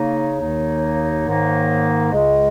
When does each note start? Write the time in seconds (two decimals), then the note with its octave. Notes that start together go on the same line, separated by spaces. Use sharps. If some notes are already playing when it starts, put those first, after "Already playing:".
Already playing: C#3 A#3 D#4 C#5
0.40 D#2 D#3 A#3 D#4
1.26 G#2 D#3 A#3 D#4
2.12 C#2 C#3 G#3 D#5